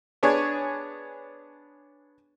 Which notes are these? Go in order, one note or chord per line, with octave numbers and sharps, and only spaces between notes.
B3 D4 G#4 C#5 G#5